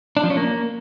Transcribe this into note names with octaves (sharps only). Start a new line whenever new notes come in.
D4
F3
C#4
A#3